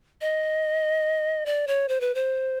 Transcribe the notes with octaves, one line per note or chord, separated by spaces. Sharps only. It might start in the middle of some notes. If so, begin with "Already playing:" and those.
D#5
D5
C#5
C5
B4
C5